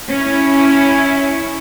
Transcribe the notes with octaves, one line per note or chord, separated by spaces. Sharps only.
C#4 E4